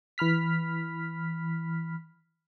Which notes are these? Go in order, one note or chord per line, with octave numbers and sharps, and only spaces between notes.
E3 B5 F6 B6